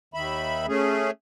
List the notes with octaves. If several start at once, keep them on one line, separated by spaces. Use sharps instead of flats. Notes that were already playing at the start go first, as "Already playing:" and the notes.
D#2 D#3 E5 B5
A3 C#4 G#4